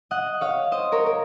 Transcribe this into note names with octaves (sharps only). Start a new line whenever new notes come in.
D#5 F#5
C#5 F5
C5 D#5
A#4 C#5
A#4